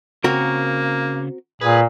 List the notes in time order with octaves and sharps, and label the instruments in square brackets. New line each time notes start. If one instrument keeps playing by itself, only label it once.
[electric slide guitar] C#3 [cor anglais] A#3 [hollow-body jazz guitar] C4 F#4 A#4
[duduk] A#2 [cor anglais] G#4 [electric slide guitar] B4